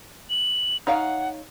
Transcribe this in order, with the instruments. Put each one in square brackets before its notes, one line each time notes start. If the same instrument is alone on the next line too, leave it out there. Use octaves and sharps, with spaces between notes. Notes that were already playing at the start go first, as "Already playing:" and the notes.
[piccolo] F#7
[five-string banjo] D#4 C#5 F5 [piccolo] F#5